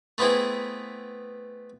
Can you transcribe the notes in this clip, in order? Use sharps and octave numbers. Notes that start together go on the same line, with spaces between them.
A3 B3 C4 E4 G#4